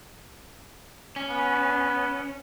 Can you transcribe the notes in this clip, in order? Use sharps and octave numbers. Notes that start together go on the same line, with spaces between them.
C#4
B3